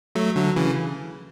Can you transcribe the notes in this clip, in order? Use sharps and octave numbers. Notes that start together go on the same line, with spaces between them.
F#3 A3
D3 F#3
C#3 E3